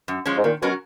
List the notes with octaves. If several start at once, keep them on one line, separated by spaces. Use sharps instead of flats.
F#2
F3 G#3 C#4
G#2
A#2 D#3
B2 F#3 C#4 F#4 A#4